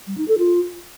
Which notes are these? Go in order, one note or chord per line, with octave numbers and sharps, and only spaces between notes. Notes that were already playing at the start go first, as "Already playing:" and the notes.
G3
D#4
A4
F4